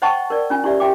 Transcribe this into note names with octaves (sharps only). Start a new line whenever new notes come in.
C5 D#5 F#5 G5 A5 C#6
A#4 D5
C#4 F4 G#5
E4 G4 D5 E5
G4 E5 G5 D6